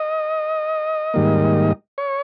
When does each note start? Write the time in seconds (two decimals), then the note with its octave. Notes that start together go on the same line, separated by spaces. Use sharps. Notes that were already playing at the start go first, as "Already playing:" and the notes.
Already playing: D#5
1.14 G#2 D#3 G3 A#3
1.98 C#5